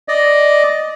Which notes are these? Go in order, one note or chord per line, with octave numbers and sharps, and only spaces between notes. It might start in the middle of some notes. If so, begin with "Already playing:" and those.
D5 D#5